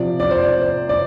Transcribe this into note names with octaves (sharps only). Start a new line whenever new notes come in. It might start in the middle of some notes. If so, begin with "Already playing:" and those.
Already playing: C3 F3 D5
D5
C5
D5
C5
D5